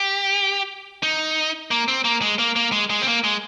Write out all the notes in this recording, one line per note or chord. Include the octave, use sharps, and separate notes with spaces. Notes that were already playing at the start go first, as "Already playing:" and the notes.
Already playing: G4
D#4
A#3
C4
A#3
G#3
A#3
A#3
G#3
G#3
C4
A#3
G#3